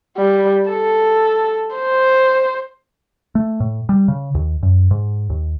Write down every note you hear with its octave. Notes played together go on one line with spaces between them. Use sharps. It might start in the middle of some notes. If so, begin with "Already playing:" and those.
G3
A4
C5
A3
A2
G3
C#3
D#2
F#2
G#2
D#2